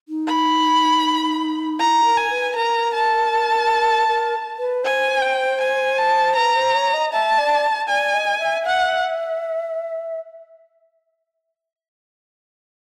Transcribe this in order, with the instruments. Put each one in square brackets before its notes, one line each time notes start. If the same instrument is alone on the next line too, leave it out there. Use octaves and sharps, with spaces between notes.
[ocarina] D#4
[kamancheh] B5
[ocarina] E4 [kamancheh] A#5
[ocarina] A#4
[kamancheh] G#5
[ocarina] B4
[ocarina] A#4 [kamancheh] A#5
[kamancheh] A5
[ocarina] A#4
B4
[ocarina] C5 [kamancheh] G#5
[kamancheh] G5
G#5
A5
[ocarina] B4 [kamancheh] A#5
[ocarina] C5
C#5
D#5
[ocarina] E5 [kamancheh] A5
[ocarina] D5
[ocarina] D5 [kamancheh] G#5
[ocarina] D#5
E5
[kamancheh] F#5